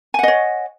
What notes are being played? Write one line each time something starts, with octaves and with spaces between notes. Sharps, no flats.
C#5 D#5 F#5 G#5